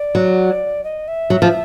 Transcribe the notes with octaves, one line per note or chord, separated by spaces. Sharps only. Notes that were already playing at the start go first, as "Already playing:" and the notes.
Already playing: D5
F#3
D#5
E5
F#3
F3